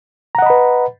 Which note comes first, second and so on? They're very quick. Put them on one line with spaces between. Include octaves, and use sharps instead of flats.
A#5 F#5 D#5 B5 B4